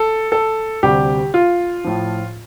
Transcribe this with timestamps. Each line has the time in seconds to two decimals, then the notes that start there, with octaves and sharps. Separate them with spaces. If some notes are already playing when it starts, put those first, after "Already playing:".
Already playing: A4
0.32 A4
0.83 D2 C3 G3 G4
1.34 F4
1.84 A2 F3